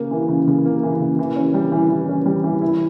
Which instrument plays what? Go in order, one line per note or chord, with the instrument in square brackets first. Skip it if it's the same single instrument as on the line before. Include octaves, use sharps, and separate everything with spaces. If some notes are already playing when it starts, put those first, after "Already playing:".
Already playing: [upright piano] C#3 A#3
E3
C#3
C#3
A#3
E3
C#3
E3
C#4
G3
E3
E3
C#4
G3
E3
E4